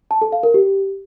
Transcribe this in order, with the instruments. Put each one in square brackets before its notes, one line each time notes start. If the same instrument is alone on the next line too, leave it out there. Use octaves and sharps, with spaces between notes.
[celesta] A5
A4
F5
A#4
G4